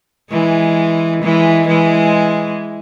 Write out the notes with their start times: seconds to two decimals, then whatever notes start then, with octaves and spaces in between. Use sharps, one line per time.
0.31 E3 G#3
1.22 E3 G#3
1.68 E3 G#3